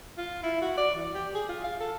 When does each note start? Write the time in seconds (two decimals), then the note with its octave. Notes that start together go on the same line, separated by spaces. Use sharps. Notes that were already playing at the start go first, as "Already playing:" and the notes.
0.18 F4
0.43 E4
0.62 F#4
0.78 D5
0.95 E3
1.14 G4
1.34 G#4
1.49 F4
1.64 F5
1.80 A4